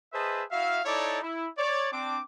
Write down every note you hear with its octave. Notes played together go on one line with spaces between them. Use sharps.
G#4 B4 C5 D#5 E5 A5
E4 F#4 E5 F5
D#4 E4 A4 C#5 D5
E4
C#5 D5
C4 D4 D6